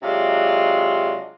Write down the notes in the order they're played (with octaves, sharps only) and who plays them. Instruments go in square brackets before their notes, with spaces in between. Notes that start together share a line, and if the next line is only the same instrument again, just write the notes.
[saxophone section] C3 F#3 G#3 D4 F4